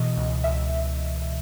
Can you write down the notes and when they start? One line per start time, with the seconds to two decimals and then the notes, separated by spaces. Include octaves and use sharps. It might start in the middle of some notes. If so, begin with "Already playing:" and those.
Already playing: B2 E3 D#5
0.17 C#2
0.44 C#2 E5